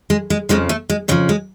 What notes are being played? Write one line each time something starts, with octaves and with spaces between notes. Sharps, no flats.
G#3
G#3
F2 C#3 F3 G#3
A3
G#3
F2 C#3 F3 F#3
G#3